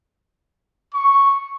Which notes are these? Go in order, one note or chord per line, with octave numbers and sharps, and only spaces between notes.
C#6